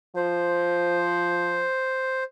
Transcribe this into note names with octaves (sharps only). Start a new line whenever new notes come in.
F3 C5